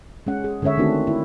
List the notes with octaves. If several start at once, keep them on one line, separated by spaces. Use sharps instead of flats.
G#3 C#4 F#5
G#4
D3 G#3 C#4 C#5 E5
D#3 A3 C4 D4 F#4
E4